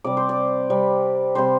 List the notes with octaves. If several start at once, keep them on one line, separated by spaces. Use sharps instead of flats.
C3 G3 D5
C5
D5
C3 G3
C3 G3 C5